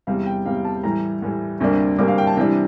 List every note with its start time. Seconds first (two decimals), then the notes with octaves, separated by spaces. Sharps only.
0.07 E2 C3 G3 F5
0.26 G5
0.45 E2 C3 G3 F5
0.65 A5
0.84 A2 E3 G3 A#5
1.22 A2 E3 G3
1.60 D2 C3 G3 A#3 D4
1.99 D2 C3 G3 A#3 D4 D6
2.08 F5
2.18 G5
2.27 A5
2.37 C3 E3 G3 D4